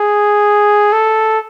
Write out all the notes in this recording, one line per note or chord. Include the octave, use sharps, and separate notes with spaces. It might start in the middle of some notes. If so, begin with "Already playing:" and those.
Already playing: G#4
A4